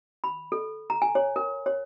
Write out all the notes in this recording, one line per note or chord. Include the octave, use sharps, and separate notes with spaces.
B5
A4
A#5
G#5
C#5
A#4
C#5